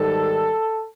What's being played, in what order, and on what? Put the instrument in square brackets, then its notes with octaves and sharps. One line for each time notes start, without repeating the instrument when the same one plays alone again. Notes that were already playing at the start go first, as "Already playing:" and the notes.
Already playing: [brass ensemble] G#2 D#3 G3 A4